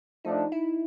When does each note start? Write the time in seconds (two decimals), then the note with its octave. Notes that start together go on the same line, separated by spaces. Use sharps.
0.24 F3 A3 D4 D#4
0.52 E4